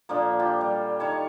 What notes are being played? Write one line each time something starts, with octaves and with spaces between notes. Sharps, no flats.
A#2 D3 F3 A#3
F4 G4
G3
D#3 B4 C#5 A5